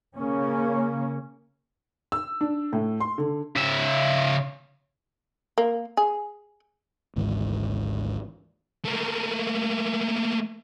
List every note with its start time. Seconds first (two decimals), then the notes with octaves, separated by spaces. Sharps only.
0.14 C#3 A#3 C#4
2.12 E6
2.41 D4
2.73 A2
3.00 C6
3.18 D3
3.56 C#3 E5
5.58 A#3
5.97 G#4
7.16 G#1 D2 G#2 E3
8.85 A3 A#3